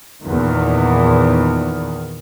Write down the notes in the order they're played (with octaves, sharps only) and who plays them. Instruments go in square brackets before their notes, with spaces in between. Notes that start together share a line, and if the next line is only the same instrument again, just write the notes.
[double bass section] E2 A#2 D#3